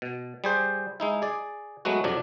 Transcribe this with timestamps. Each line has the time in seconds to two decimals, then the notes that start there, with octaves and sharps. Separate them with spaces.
0.02 B2
0.44 G3 G#4 C5
1.00 G#3 D#4 E4
1.22 G#4 D5
1.85 F#3 G#3 A3 B3 F#4
2.04 F2 C3 F#3 D4